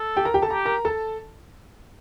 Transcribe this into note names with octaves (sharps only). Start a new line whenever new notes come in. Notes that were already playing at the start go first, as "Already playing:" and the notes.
Already playing: A4
G4 G5
A#4 A#5
G4 G5
A4 A5
G4 A#5
A#4 A#5
A4 A5